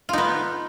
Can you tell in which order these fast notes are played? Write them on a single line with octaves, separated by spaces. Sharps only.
F4 D#4 B3